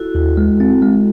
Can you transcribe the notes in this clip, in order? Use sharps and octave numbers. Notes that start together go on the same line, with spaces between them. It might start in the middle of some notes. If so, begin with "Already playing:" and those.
Already playing: E4 F#4 A4
D#2
G#3
C4
G#3